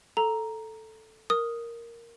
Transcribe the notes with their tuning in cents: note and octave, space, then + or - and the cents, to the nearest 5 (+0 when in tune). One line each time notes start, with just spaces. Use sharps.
A4 +0 A#5 +0
A#4 +0 D#6 +0